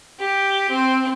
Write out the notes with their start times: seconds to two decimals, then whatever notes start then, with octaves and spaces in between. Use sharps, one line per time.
0.19 G4
0.70 C4